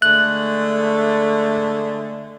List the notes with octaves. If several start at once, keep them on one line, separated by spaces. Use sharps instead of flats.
D3 G#3 A3 F#6